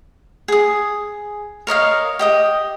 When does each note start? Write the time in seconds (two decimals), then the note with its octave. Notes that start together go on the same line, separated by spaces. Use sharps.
0.48 G#4 D#6
1.67 A#4 C#5 D#5 F5
2.19 G4 D#5 D#6